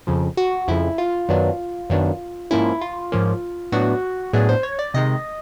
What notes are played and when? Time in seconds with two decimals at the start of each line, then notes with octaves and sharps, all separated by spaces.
0.07 F2 C#3 F3
0.37 F#4
0.68 F2 C#3 F3 E4
0.98 F4
1.29 F#2 D#3 F#3 B3 D4
1.90 F#2 D#3 F#3 B3 D4
2.51 G#2 F3 A#3 C#4 E4
2.81 F4
3.12 G#2 F3 A#3 C#4
3.72 A2 F#3 B3 D4 F#4
4.33 A2 F#3 B3 D4 G#4
4.49 C5
4.63 C#5
4.79 D5
4.94 C3 D#3 G#3 D#5